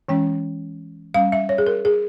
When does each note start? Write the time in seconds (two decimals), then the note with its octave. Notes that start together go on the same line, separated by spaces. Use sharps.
0.09 E3 G#3 C#4 G5
1.14 G3 C#4 F5
1.32 E5
1.49 C#5
1.58 G#4
1.67 A#4
1.85 G#4